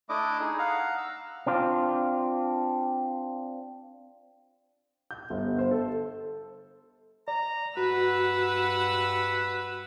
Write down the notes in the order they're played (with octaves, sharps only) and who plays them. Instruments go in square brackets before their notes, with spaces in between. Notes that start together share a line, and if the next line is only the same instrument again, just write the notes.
[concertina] A3 D4 E4 D#5 D6
D#4 G#4
F5 F#5 A#5
E6
[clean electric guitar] C4 D4 F4
[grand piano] G6
G1
C5
A4
[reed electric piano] D5 [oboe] A#5
[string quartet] G2 F#5 E6 [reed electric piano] F#4 [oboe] B4